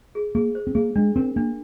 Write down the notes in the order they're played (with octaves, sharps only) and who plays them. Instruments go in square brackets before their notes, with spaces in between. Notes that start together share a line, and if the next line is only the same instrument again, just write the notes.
[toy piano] G#4
[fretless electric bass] A#3 [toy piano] G#4
[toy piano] C5
[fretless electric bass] C4
[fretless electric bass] A#3 [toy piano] G#4
[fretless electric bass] G#3 [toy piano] D4
[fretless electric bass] C4 [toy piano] A#4
[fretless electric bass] A#3 [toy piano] D4